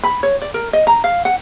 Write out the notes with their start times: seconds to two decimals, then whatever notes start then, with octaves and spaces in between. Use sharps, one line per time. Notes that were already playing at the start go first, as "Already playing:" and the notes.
0.04 B5
0.23 C#5
0.42 D5
0.54 A#4
0.73 D#5
0.87 A#5
1.04 F5
1.25 F#5